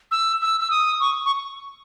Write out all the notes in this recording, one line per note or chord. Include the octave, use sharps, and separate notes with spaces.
E6
E6
E6
D#6
C#6
C#6